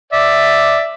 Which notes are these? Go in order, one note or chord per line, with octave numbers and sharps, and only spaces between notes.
D5 E5